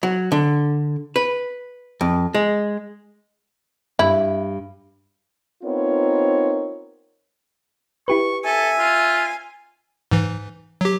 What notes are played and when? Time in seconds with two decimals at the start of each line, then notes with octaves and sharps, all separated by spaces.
0.03 F#3
0.32 D3
1.16 B4
2.01 F2
2.35 G#3
3.99 G2 E4
5.63 B3 C4 D#4 F4 A#4 C#5
8.08 E4 G4 B4 C#6
8.45 A4 E5 G#5
8.78 F4
10.11 G#2 E3
10.81 F#3 G4